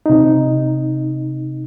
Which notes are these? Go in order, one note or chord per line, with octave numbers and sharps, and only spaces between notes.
C3 D#4